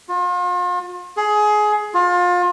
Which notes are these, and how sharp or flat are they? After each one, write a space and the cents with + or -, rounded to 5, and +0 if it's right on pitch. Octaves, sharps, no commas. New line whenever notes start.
F4 +40
G#4 +20
F4 +30